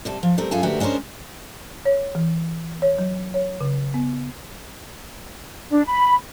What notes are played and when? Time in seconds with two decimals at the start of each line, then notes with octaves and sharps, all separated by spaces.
0.05 C3 G3 A5
0.23 F3
0.38 G3 A3 C4 A#4
0.51 F#2 F4 G#4 A4 G#5
0.63 D2 F#4 G4 A#4 B4 E5
0.80 G#3 C#4 D4 A#4 C5
1.85 C#5
2.15 E3
2.82 C#5
2.98 F#3
3.34 C#5
3.60 C#3
3.94 B3
5.71 D4
5.85 B5